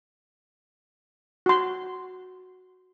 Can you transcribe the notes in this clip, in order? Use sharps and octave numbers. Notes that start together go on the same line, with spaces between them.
F#4 C6